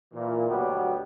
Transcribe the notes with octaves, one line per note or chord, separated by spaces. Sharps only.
A#2 E3
D2 B2 F#3 G3 B3 G4